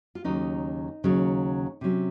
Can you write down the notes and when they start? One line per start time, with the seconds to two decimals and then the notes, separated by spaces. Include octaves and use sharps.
0.15 F4
0.24 D#2 C#3 F#3 C#4 D#4
1.04 D#2 C#3 F#3 C#4
1.81 C3 F#3 C#4